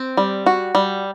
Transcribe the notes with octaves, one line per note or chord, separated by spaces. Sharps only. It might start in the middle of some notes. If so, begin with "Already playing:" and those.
Already playing: C4
G3
F#4
G3